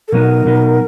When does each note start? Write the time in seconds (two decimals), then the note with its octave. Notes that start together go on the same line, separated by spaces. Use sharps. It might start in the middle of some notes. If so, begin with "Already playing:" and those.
0.08 A4
0.12 B2 F#3 B3 D#4 A#4
0.46 B2 F#3 B3 D#4